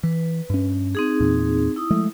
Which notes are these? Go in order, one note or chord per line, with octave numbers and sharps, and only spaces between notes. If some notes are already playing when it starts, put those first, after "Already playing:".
E3 B4
G2 C#4
C4 D#4 G#4
E2 A#2
E4 D#6
F3 G#3 A3